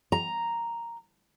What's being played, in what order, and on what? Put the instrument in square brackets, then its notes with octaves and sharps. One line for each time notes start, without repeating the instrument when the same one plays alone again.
[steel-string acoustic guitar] A#5